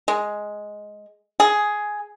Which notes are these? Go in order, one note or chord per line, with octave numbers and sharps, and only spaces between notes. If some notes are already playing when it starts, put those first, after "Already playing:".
G#3
G#4